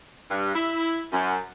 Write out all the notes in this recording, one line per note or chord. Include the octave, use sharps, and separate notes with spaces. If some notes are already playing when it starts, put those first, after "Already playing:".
G2
E4
F#2